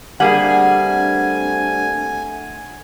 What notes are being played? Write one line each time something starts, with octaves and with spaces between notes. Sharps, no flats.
G3 A3 A#3 C4 D4 G#4 F#5 G#5